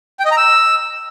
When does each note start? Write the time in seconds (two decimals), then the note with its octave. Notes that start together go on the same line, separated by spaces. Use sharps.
0.19 G5
0.25 D#5
0.31 A#5
0.37 E6